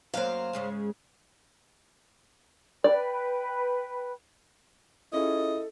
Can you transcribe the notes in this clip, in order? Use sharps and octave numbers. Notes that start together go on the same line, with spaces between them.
F#2 F#3 A#3 C5 F5
G#2 C#3 G#3
B4 D5 G5 B5
C#4 E4 F4 G#4 A4 D#5